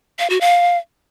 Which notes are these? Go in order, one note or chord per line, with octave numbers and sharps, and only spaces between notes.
F5
F#4
F5